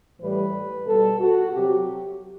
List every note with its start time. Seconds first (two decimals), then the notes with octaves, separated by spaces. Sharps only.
0.21 A2 E3 G3 B4
0.86 B2 G3 A4
1.20 F#4
1.52 C3 F#3 G4